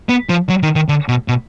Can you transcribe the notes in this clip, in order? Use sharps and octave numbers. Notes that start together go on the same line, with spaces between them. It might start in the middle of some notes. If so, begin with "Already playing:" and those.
B3
F3
F#3
D#3
D#3
D3
B2
B2